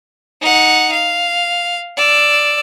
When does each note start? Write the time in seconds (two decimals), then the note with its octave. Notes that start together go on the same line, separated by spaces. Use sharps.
0.41 D#4 F#5
0.92 F5
1.97 D5 E6